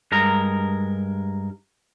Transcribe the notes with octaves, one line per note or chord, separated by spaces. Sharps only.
G2 G#3 A#4 A#5